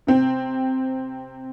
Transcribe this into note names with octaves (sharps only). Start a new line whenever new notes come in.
C3 C4